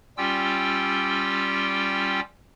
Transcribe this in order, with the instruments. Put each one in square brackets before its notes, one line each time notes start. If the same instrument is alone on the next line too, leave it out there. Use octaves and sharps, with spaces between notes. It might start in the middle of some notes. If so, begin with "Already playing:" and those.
[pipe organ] G3 C#4 F4 G4 G5 E6